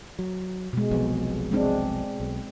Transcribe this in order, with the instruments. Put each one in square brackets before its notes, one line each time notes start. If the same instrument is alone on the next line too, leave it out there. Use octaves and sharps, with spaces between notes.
[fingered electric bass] F#3
[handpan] B2 G#3
[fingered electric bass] F1 B1 F2
[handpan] G#3 C4 D4
[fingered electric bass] B1